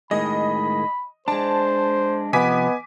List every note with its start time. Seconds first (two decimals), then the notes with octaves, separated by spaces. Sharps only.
0.11 A2 D#3 G#3 D#5 B5
1.28 G#3 D4 C5 A5
2.33 C3 F3 B3 B4 D#5 G#5 D6 B6